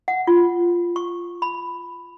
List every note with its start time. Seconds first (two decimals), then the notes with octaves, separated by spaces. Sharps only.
0.08 F#5
0.27 F4
0.96 C#6
1.42 B5